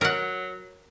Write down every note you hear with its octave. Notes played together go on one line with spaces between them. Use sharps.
F#3 A#4 F#5